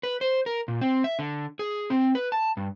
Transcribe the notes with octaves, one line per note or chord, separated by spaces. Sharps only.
B4
C5
A#4
A#2
C4
E5
D3
G#4
C4
B4
A5
G2